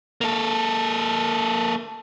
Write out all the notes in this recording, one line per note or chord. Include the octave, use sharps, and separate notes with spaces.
A#3 A4